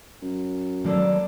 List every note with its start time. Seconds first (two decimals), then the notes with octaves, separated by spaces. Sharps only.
0.22 F#2
0.84 D#3 F#3 G#3 A#3 D4 A4